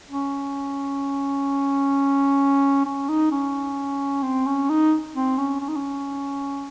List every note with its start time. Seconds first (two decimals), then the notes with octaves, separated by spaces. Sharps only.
0.10 C#4
2.85 C#4
3.09 D#4
3.32 C#4
4.23 C4
4.46 C#4
4.69 D#4
5.15 C4
5.38 C#4
5.61 C#4
5.68 D#4
5.76 C#4